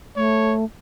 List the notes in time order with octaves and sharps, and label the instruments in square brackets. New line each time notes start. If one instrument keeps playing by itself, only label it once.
[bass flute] A3 [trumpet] C#5